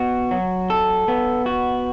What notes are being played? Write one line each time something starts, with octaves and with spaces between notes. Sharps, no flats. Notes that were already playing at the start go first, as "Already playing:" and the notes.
Already playing: B3 F#4
F#3
A4
B3
F#4